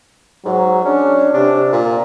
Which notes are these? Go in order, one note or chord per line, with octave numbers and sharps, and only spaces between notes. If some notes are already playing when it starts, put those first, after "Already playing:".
G#2 F#3
C#4 D4
C3 D4
A#2